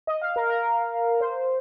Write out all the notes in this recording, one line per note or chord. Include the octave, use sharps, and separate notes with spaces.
D#5
F5
A#4
A#4
C5